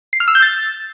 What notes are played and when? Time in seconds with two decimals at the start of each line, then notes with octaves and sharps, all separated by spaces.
0.13 C7
0.20 F6
0.28 E6
0.35 G6
0.42 A6